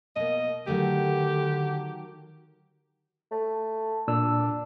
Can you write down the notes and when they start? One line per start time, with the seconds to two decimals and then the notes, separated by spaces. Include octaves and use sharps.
0.16 B2 A#3 D#5
0.67 D3 D#3 F#3 A3 G4
3.31 A3
4.08 A#2 D4 E6